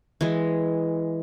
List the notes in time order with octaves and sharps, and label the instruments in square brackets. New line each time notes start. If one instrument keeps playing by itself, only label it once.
[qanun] E3 G#3